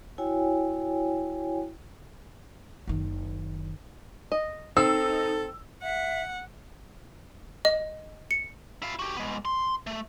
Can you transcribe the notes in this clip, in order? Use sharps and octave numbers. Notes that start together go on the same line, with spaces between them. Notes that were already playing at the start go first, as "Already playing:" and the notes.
E4 F#4 C#5 G5 G#5
F#1 D#3
D#5
C4 D#4 A4 E6
E5 F#5
D#5
C#7
E4 F5
F#4 G4
G#3 B3
C6
A3